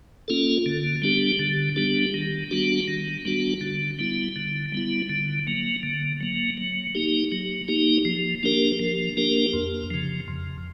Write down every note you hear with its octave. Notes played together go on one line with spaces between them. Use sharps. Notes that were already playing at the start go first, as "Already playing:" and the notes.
A#3 C#4 F4 A4
D3
G3 B3 D4 G4
D3
G3 B3 D4 G4
D#3
G3 B3 D4 F#4
D#3
G3 B3 D4 F#4
D3
G3 B3 E4
D3
G3 B3 E4
D3
F#3 A#3
D3
F#3 A#3
F#3
A#3 D#4 G4
F#3
A#3 D#4 G4
F3
A#3 D4 G4 A#4
F3
A#3 D4 G4 A#4
F2
C#3 F3
F2